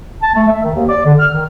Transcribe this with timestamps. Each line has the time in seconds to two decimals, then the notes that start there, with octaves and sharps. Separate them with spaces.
0.22 A5
0.35 A3
0.48 E5
0.62 D#3
0.74 D#2
0.89 D5
1.06 D3
1.20 F6
1.33 D#3